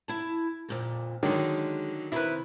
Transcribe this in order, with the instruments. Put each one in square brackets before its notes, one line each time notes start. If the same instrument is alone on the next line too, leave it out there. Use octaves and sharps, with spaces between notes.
[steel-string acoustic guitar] E4 A5
F2 A#2 D3
[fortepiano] D3 D#3 F#3 [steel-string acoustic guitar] G#3
[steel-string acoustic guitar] C3 D#3 [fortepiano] E4 B4